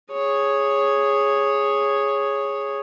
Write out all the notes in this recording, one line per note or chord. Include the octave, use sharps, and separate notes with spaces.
G#4 C#5